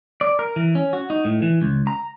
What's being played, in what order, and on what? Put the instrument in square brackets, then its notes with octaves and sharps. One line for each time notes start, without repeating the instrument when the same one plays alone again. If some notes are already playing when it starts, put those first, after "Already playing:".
[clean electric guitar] D5
A#4
E3
C#4
F#4
D#4
A2
E3
C#2
A#5